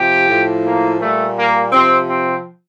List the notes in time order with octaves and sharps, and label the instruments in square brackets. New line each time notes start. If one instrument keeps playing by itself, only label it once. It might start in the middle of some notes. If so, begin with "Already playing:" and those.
Already playing: [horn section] C3 F3 G4
A2 F3
A#3
A#2 G3 A3
A#3
C3 F3 C4
C4